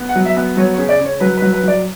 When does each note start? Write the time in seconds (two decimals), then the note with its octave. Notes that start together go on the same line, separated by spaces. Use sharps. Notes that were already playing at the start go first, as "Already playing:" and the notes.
Already playing: B3
0.09 F#5
0.16 F#3
0.25 E5
0.37 B3
0.57 F#3 C#5
0.74 C#3 C#5
0.89 D5
1.00 C#3 C#5
1.20 F#3 B4
1.37 F#3 B4
1.53 B4
1.63 F#3 D5